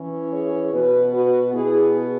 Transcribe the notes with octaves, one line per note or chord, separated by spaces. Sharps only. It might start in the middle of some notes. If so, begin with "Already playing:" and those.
Already playing: E3 C#4
G#4 C#5
B2 B3 F#4 B4
F#4 B4
B2 B3 E4 G#4